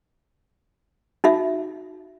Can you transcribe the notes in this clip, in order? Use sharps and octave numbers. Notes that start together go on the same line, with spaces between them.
D#4 F#4 E5